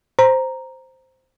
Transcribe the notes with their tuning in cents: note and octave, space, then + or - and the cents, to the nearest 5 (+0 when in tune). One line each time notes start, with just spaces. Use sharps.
C5 +0 A#5 +0